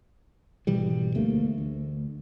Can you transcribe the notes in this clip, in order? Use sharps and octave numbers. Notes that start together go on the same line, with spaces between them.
G#1 B2 E3 G3
D2 A3 A#3
D2